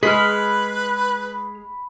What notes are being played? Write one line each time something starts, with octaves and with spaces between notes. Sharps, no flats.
G#3 G#4 B4 B5 F6